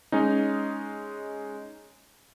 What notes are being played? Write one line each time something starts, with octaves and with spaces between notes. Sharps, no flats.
G#3 C#4 D#4